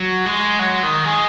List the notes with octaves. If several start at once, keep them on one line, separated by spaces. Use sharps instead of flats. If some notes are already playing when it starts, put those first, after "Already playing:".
Already playing: F#3
G#3
F#3
D#3
G#3